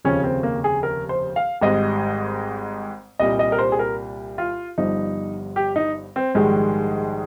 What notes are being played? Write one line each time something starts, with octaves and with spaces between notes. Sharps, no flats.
F1 D#2 C#3 F3 C#4
C4
A#3
G#4
A#4
C5
F5
G#1 G#2 G3 D#5
C2 A#2 G3 D#5
D#5
A#4
C5
G#4
A#4
F4
G1 G2 F3 D#4
G4
D#4
C4
A#1 G#2 D#3 G3 G#3